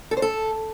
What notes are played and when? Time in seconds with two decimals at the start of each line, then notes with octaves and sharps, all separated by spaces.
0.11 A4
0.17 C5
0.22 A4